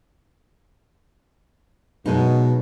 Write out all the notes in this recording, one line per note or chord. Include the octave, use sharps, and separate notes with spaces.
F#2 B2 G#3 D#4